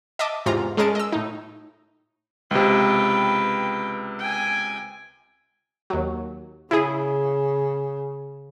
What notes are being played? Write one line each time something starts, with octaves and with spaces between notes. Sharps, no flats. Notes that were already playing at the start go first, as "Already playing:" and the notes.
D#5 E5 A5 D6 D#6
E2 G#2 C3 F4 A#5
G#3 C#4 G#4 A#4 A5 D7
D#5 E6
A2 D#4
C#2 C3 B4 G5
G5 G#5
D#2 F#3
C#3 E4 G#4